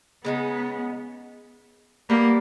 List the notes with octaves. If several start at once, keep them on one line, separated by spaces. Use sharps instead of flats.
C#3 G#3 B3 D#4
G3 A#3 B3 G4 A#4